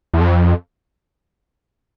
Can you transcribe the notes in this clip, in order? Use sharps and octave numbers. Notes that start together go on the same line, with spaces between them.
E2
F2